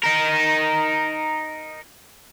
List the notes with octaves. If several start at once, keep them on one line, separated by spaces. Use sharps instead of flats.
D#4 A#4